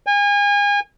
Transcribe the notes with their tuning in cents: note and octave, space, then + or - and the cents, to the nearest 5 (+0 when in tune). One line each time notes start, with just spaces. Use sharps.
G#5 -35